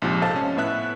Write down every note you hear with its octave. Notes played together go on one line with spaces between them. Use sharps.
A#1 G#2 C3 F3
A4 C5 D#5 F5 A5
C#4
A2 B3 E5 F#6